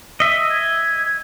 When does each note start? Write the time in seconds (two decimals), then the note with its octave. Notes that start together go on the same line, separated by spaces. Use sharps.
0.20 D#5 E5 D#6
0.49 G#6